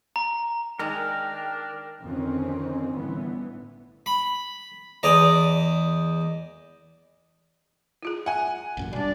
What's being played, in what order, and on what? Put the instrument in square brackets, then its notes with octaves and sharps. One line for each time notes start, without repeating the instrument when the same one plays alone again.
[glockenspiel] A#5
[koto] D#3 G#3 [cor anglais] D4 [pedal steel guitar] A#4 [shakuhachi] G5
[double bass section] F2 D3 D#3 C4 C#4
G1 A2 E3 B3
[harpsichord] B5
E2 D5 D#5 A#5
[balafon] E4 F4 G#4
[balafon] E5 [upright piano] F#5 G#5
[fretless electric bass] A1 F#2 A#2
[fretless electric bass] B2 G3 [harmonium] D4 [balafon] D5